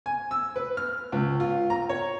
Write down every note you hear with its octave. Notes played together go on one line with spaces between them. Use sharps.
G#5
E6
B4
F6
C#2
F4
A#5
C#5